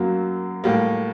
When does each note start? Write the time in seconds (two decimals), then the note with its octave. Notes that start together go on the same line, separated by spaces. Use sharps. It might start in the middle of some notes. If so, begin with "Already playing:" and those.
Already playing: F#2 F#3 A#3
0.64 A2 G3 A#3